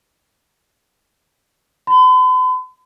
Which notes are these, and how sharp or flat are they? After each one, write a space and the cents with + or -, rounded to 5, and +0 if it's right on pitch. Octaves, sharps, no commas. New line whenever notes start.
B5 +45